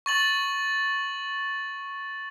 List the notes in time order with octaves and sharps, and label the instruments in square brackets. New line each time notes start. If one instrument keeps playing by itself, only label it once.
[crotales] C#6 A6 F#7